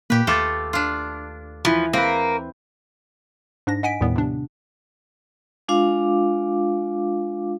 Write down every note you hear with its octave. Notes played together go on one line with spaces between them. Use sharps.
A#2 A#3 G4 B4
D#2 A3 F4 A4 D6 A6
D4 F4
E3 F3 B4
A#3 C4 B4
G#2 D4 A#6
D#5 F#5 G#5 B6 D7
D#2 A2 D#3 G3 B3
C3 D4
G#3 D4 F4 F5 D6